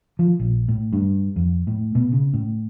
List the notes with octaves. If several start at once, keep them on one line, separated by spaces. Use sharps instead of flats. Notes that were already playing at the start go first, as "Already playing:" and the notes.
F3
A#1
A2
G2
F2
A2
B2
C#3
A2